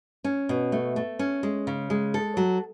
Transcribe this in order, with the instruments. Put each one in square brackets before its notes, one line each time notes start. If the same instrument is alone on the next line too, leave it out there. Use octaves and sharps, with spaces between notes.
[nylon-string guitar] C#4
B2
A3
A3
C#4
G#3
C#3
G#3
A4
F#3